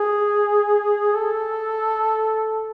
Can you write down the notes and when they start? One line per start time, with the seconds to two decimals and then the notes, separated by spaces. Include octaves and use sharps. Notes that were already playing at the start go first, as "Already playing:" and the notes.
Already playing: G#4
1.15 A4